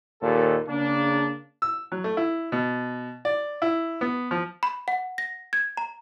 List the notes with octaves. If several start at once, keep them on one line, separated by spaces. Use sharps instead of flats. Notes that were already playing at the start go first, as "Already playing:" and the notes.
D#2 A#2 A4
C#3 A#3 D4
E6
F#3
A3
E4
B2
D5
E4
B3
F3
B5
F#5
A#6
G#6
A#5